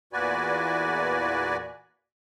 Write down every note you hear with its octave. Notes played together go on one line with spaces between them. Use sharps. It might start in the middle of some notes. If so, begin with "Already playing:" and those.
E2 A#2 F#4 B4 D5 G#5